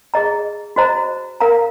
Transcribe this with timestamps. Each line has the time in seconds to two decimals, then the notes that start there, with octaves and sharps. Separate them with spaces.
0.14 G#4 D#5 A#5
0.76 F#4 C5 D#5 A#5
1.40 A#4 F5 A#5